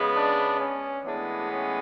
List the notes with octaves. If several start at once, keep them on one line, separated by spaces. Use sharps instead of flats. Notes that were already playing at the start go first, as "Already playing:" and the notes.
Already playing: C#3 G#3 B3
D4
C#4
A2 E3 G#3 B3 D4
C#4